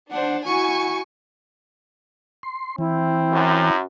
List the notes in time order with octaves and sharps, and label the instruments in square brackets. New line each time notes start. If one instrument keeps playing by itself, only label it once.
[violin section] D4 [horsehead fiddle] C5 F#5
[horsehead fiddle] E4 F#4 [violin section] G#5 C#6
[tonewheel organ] C6
[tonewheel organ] E3 [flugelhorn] C4 [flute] E4
[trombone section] F#2